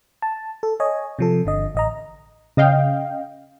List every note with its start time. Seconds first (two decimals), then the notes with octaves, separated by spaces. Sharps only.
0.22 A5
0.63 A4
0.80 C#5 D#5 G#5
1.19 C3 F3 A4
1.46 G1 D3 D#5
1.75 A1 D#5 A#5
2.57 C#3 D#5 F5 G5